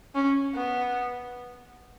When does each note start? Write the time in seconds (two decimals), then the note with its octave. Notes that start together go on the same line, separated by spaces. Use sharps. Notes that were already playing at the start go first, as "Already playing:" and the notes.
0.15 C#4
0.55 B3